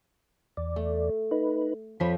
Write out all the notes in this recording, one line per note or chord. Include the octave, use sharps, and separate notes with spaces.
E2 D5
A3
D#4 B4
F2 F3 C#5 B5